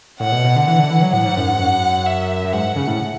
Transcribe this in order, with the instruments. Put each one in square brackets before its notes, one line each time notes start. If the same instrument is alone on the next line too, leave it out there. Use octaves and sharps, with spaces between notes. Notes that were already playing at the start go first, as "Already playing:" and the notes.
[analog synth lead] A2 [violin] F#5
[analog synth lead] B2
B2
D3
[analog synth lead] E3 [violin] F#5
[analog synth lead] D3
E3
F#3
[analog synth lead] A2 [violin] F#5
[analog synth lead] G#2
F#2
G#2
F#2
[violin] E5
[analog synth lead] F#2
[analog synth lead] G#2 [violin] F#5
[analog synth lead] C#3
A2